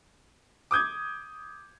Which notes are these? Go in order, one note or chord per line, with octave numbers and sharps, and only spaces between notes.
D6 D#6 G6 G#6